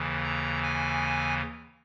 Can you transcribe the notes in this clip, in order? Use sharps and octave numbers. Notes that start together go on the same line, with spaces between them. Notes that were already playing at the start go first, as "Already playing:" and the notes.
Already playing: D#2 C#3 E3
A#5
G#5